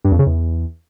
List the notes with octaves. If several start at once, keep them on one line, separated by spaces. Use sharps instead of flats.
G2
F2
C#3
E2